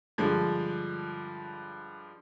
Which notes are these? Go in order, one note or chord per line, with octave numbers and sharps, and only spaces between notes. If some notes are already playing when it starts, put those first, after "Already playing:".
G2 D3 F3 G#3